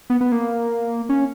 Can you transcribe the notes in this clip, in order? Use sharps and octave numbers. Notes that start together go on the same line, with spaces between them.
B3
B3
A#3
C#4